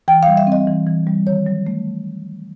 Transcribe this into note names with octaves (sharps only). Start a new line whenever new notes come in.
E3 G5
G3 F5
E5
C4 D#5
E3
E3
G3
D#3 C#5
F#3
A3